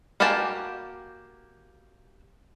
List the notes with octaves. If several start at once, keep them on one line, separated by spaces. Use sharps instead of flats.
A#3 F#4 G4 G#5 A5